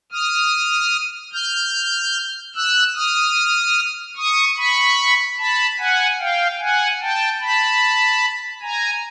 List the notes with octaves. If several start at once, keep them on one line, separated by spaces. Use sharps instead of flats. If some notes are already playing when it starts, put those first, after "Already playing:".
D#6 F6
F6 G6
E6 F#6
D#6 F6
C#6 D#6
B5 C#6
A5 B5
F#5 G#5
F5 G5
F#5 G#5
G5 A5
A5 B5
G#5 A#5